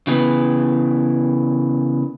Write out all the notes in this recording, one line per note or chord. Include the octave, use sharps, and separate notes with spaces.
C#3 E3 B3